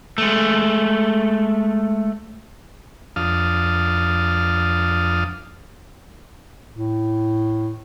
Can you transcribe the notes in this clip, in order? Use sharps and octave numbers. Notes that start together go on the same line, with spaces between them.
G#3 A3
F2 D4 F5 A5 D#6 F6
A2